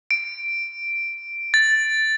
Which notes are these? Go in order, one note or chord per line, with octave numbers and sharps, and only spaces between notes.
D7
A6